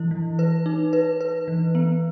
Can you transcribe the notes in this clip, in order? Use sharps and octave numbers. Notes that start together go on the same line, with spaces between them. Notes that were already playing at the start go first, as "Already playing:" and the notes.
Already playing: E3 E4
E3
B4
D#4
B4
B4
E3
B3